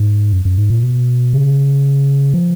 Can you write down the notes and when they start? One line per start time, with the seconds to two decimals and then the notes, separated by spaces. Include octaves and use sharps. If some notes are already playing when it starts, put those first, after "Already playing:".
Already playing: G#2
0.33 F#2
0.45 F#2
0.58 G#2
0.70 A#2
0.83 B2
1.33 C#3
2.34 F3